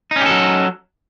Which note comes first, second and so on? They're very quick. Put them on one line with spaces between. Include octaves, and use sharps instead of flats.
D#4 C#4 G4 A4 F#3